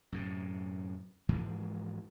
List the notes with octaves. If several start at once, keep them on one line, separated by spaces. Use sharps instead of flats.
F#2 A2 C3
G#2 E3 F3 G#3